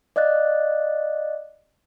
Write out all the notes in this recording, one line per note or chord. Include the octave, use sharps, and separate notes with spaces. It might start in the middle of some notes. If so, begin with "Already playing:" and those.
D5 D#5 F5 F#6 A6